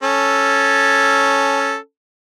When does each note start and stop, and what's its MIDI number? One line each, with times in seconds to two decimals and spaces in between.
0.03 1.76 61
0.03 1.76 69